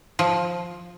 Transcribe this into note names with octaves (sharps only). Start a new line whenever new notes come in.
F3